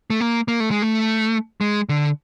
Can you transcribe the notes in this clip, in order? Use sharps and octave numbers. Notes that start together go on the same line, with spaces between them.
A3
A#3
A#3
A3
G#3
A3
G#3
D3